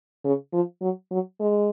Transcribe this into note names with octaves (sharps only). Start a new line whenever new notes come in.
C#3
F3
F#3
F#3
G#3